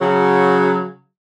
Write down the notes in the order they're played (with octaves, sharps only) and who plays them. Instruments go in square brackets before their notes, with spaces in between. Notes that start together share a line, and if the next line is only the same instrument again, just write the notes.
[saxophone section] C#3 F#3